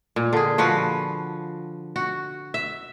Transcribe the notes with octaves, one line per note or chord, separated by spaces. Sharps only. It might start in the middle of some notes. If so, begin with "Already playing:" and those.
A#2
D3 G#4
F3 F#4 B4 F5
F#4
E5